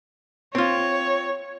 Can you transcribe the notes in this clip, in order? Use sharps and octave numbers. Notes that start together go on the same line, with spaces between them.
C4 F4 C#5